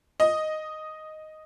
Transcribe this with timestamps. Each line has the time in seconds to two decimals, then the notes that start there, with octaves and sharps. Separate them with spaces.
0.20 D#5